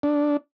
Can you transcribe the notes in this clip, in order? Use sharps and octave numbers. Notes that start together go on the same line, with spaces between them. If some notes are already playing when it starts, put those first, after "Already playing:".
D4